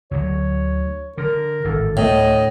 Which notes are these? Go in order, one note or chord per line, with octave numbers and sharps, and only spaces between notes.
D2 D3 F#3 C#5
D3 A#4
G#1 A2 D3 A4
D2 A2 D#5